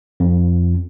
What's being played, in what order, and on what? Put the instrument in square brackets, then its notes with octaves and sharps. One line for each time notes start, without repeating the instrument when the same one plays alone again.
[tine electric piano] F2